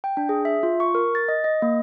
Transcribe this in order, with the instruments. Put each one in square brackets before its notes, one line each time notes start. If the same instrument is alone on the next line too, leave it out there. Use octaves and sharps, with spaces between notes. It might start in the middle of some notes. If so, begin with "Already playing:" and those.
[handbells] G5
D4
G#4
E5
F4
C#6
A#4
A6
D#5
D#5
A#3